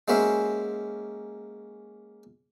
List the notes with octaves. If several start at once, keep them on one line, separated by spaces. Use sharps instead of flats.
G#3 A#3 C#4 F#4 C5 E5